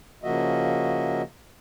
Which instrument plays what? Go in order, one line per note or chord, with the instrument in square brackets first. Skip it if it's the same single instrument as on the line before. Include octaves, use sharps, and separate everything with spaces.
[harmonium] C#3 F3 A#3 F#4 D#5 E5